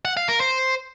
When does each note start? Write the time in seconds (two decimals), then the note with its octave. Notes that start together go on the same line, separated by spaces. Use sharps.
0.05 F#5
0.17 F5
0.29 A#4
0.40 C5